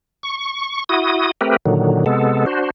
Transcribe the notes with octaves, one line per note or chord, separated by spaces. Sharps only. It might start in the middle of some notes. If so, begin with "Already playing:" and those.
C#6
E4 F#4 D#6
A3 C4 G4 A#4 B4
A#2 D3 D#3 F#3
C3 G#3 B3 A4
D4 F#4 C5